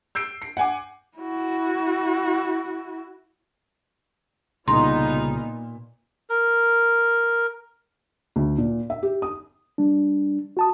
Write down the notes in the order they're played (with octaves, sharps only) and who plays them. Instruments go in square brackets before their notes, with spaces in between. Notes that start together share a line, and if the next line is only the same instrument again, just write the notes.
[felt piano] E6 G6 C7 D7
C7
F#5 G#5 D6
[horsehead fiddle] E4 F#4
[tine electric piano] C2 C#3 A#5 [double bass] A#2 [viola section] B3 D#4 F4 [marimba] C6
[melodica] A#4
[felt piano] D2
A#2
E5
G4
D#6
[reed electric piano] G3 D4
F#4 A5 D#6